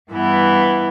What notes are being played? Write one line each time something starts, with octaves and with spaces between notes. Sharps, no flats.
G2 E3 B3 E4